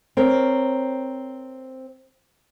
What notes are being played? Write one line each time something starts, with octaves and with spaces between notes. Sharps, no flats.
C4 A#4 C#5